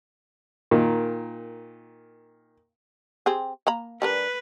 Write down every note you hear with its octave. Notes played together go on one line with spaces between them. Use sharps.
A#2 D#3
C4 G4 G#4
A#3 A#5 B5
G3 D4 A#4 B4